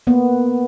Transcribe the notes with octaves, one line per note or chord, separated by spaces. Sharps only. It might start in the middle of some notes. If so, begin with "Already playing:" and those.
A#3 B3